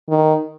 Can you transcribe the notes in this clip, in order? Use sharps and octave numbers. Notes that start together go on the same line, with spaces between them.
D#3